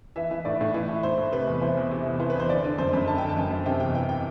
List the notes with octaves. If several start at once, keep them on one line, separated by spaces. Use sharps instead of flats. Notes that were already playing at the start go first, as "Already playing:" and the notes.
E3 E5
E3
A2 D5
A2
E3
E3
A2 C5
A2
C3 B4
E2
E3 C5
E2
C3
E2
E3 C5
B4
E2 C5
D3 D5
D3
F#2 C5
F#2 B5
D3 A5
D3 G5
A5
F#2
F#2
C3 G5
E2 G5
E3 G5
G5